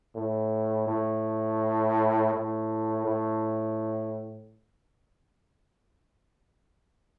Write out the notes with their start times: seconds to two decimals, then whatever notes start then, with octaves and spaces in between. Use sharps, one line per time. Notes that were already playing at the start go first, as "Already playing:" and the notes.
0.15 A2
0.87 A2
2.33 A2
3.05 A2